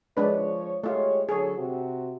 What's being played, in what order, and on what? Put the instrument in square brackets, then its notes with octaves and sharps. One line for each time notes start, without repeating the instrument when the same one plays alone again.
[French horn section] F3 C#5 [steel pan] G#3 D4 B4
[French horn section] G#3 G4 C#5 [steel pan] A3 F4
[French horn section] D3 F#3 A4 [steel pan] G#4 C#5
[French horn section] C3 F#4